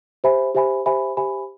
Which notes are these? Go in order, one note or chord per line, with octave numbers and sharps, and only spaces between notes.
G4 C5 E5 G#5 B5
G4 C5 E5 G#5 B5
G4 C5 E5 G#5 B5
G4 C5 E5 G#5 B5